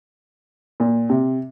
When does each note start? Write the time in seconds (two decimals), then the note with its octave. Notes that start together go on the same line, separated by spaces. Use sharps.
0.80 A#2
1.09 C3